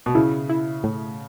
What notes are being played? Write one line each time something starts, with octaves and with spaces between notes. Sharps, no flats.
B2
C#3 E4
E4
A2